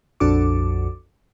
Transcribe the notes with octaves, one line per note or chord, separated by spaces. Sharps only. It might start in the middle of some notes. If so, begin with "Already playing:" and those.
A#1 F2 D4 F#4 A4 D6